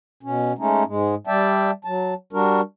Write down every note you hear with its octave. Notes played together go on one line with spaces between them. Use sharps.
B2 C#4
G#3 A3 C#4 D#4
G#2 G#3
G3 D5 E5 G5 A5
F#3 A5
G3 D4 F#4 A#4